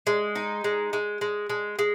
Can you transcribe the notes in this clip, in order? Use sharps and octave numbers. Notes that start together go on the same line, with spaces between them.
G#3
D#4
G#3
G#3
G#3
G#3
G#3